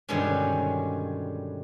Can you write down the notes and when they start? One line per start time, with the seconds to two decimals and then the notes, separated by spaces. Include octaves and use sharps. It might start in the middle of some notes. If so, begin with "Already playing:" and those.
0.09 G2 B2 D3 D#3 G#3 C#4